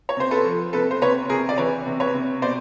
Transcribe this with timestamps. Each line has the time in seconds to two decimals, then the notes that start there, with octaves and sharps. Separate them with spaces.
0.09 C#5
0.17 C3 C5
0.31 A4 B4
0.45 F3
0.73 C3 A4 B4
0.91 C5
1.02 C3 B4 C#5
1.29 C3 G#4 A#4
1.49 D5
1.57 E3 B4 C#5
1.86 C3
2.00 B4 C#5
2.14 C3
2.41 B2 C5 D5